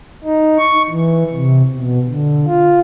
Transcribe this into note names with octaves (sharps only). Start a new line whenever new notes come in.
D#4
C#6
E3
C3
B2
D3
F4